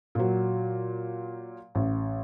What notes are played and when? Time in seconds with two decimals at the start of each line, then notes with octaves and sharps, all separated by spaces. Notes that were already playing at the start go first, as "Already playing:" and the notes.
0.15 A#2 F#3
1.75 A1